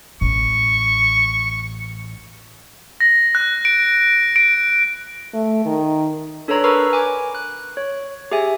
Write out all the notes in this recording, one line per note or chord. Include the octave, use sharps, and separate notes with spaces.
A1 C#6
A#6
F#6
D7
D7
A3
D#3
D4 A4 B4 C#5 A#5 C6
A#4 B4 A#5 B5 C#6 E6
G#5 D6
F#6
C#5
G4 G#4 E5 G#5